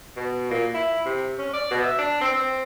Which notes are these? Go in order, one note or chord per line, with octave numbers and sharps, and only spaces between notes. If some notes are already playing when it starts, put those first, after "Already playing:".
B2
A#2
E4
C3
C#4
D5
B2
E5
D4
C4
C4